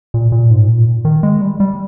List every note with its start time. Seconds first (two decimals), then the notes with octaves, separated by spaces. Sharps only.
0.14 A#2
0.32 A#2
0.51 G#2
0.68 A#2
1.05 D#3
1.23 G#3
1.41 G3
1.60 G3